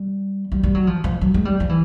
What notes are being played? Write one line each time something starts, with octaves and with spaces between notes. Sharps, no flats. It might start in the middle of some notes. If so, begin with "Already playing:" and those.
Already playing: G3
G3
G3
F#3
F3
F3
F#3
G#3
G3
F3
E3